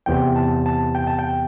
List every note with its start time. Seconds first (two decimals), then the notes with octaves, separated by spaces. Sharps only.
0.06 E2 C3 E3 G5
0.36 A5
0.66 A5
0.95 G5
1.07 A5
1.19 G5